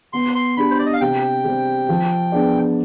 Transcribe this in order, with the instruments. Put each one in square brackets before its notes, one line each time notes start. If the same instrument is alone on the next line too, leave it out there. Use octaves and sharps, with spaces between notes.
[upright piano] B3 [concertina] C6
[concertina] C6
[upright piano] D4 G4 [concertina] B5
[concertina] C5
D5
D#5
F5
[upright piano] C3 [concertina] G5
[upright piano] G3 C4
F3
B3 D4 G#4 D5